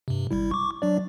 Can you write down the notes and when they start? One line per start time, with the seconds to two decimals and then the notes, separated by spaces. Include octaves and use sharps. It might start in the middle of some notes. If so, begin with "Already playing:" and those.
0.08 G2 C3
0.31 G#1 G3 E4
0.51 C#6 D6
0.82 F#3 D4 D5